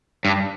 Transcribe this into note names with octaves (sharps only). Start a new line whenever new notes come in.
G2